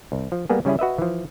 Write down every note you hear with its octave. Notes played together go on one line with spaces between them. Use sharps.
C2
F3
G3 A#3 B3 G#4
C#3 G3 C#4 E4 G#4
F#4 B4 D#5 E5
E3 F3